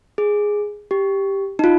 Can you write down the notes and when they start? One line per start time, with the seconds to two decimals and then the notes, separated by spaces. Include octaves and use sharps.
0.18 G#4
0.91 G4
1.59 D#4
1.64 F4